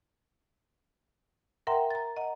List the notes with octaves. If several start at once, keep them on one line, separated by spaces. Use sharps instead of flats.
A#4 E5 F#5 G5 A#5 C6
A#5 A6
D#5 F#5 A#5